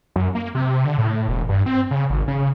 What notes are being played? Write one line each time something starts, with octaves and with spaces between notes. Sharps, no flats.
F#2
A#3
C3
D3
A2
E1
G2
C4
C#3
G#1
C#3